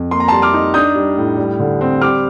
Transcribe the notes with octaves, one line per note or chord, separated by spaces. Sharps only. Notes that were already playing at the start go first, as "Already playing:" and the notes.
Already playing: F2
A#3 C6
A#5
G3 A5 C6
D6 F6
D#4
D4 D#6 G6
G3
A2
G3
D3
C4
G3 D6 F6